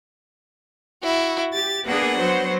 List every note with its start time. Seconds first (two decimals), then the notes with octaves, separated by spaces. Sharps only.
1.03 E4 F#4
1.53 G4 A6
1.86 A#3 B3 D4 G#4 F#5
2.17 F#3 C5